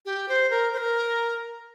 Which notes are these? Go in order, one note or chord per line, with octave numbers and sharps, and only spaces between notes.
G4
C5
A#4
C5
A#4